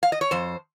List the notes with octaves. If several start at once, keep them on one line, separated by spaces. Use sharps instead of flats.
F5
D#5
C#5
F2 C5